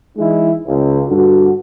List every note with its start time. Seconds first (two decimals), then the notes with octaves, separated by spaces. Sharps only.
0.17 E3 G#3 D#4 E4
0.68 C#2
1.09 G2 D3 F#4